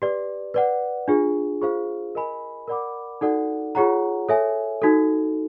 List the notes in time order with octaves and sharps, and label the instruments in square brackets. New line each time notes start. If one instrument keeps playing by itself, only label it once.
[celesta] G4 B4 D5
B4 D5 F#5
D4 F4 G#4
F4 G#4 C5 F5
A#4 D#5 G#5 B5
A#4 D5 F#5 B5 D6
D#4 F#4 A4 D5 F#5
F4 G#4 C#5 F#5 A#5
A4 C#5 E5 G#5
D#4 F#4 A4